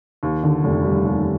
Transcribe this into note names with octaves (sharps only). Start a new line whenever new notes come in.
D#2
D3
F1
G3
D#2